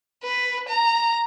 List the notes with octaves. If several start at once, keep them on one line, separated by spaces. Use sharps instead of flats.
B4
A#5